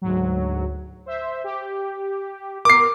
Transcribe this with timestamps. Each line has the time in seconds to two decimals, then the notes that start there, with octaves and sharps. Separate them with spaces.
0.02 D2 G#2 F#3
1.06 C5 E5
1.44 G4
2.65 B3 A#4 D6 C7